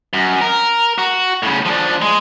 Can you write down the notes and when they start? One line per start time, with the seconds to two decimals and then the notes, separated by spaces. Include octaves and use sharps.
0.13 F#2
0.41 A#4
0.98 F#4
1.43 A2 C#3
1.65 F3 D4
2.02 G#3